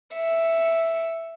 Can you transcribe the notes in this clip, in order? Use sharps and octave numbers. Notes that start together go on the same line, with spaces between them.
E5 C#7